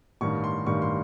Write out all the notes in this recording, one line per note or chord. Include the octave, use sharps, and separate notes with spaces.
A1 G2 D#3 C#6
C6
A1 G2 D#3 C#6
C6